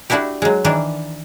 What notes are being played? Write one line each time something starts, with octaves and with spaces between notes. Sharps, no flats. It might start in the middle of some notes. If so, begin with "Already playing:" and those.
A3 D4 E4 F#4 G4
F#3 G#3
D#3 E3 D4 A#4